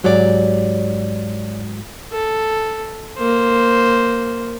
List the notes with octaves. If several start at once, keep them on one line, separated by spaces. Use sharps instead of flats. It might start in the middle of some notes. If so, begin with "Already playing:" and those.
G#2 F#3 G4 C#5 D5
A4
A#3 C5